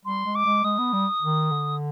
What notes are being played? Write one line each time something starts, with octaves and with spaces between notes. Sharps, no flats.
G3 C6
G#3
D6
G#3
G#3 D#6
B3
G3
D#3
D3